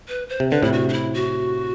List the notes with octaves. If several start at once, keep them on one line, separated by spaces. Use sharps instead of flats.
B4
C5
C3
D3 B4
A2 C3 E4
F#4
D4
E4
F#4